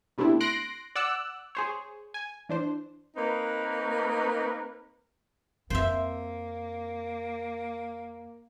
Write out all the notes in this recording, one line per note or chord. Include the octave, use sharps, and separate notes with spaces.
B2 G3 A3 C4 D4 E4
C6 F#6 A#6 C7 D7
D5 F#5 E6 F#6
G#4 C5 C#5
G#5
E3 D4 C5
A#3 C4 D#4 A#4 B4
F2 A#3 C4 C5 E5